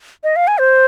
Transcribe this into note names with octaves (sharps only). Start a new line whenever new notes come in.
D#5
F5
G#5
C5